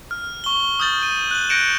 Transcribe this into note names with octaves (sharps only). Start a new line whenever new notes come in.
F6
C#6 G7
D#6 F6 G6 A6 F#7
D#7
F#6 F#7
F#6 G6 A#6 C#7 D7 E7